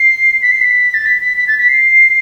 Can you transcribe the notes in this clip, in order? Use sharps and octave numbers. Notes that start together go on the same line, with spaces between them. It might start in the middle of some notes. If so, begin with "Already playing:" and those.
Already playing: C7
B6
C7
B6
A6
B6
B6
B6
A6
B6
C7